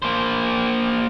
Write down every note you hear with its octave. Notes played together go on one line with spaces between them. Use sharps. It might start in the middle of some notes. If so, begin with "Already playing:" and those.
A#3 C5